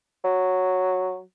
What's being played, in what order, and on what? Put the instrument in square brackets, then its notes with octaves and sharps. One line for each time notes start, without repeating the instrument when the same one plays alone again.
[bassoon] F#3